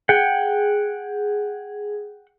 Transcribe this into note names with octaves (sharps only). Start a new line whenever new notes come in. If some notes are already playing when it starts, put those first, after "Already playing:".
G#4 F#5 G5